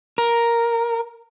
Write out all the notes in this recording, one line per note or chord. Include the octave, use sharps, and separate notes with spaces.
A#4